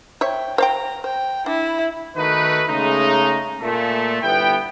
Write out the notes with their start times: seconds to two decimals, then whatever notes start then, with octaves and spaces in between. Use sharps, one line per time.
0.21 C5 C#5 E5 G5
0.58 C5 F5 G5 A#5
1.04 C5 G5
1.46 D4 E4
2.16 D#3 A3 D#4 F#4 B4
2.68 C#3 G#3 A3 D#4
3.61 A#2 A3
4.22 G1 B3 E4 G5